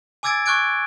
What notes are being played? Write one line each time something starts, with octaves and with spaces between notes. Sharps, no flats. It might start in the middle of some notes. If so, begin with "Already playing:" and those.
G#5 D6 E6 G#6 A6 D7
C#6 D6 F6 F#6 G#6 D7